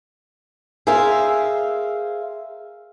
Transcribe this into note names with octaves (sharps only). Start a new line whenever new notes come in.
G#4 A#4 C5 E5 F5